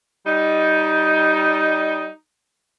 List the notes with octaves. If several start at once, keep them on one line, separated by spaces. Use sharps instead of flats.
G3 D#4